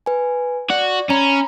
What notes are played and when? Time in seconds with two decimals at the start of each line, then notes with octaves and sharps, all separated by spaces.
0.06 B4 G#5
0.70 F#4 D5
1.10 C#4 A#5 B5